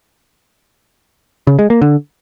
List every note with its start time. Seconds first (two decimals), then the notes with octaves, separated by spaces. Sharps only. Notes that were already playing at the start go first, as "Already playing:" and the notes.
1.47 C#3
1.59 G#3
1.70 A#3
1.82 D3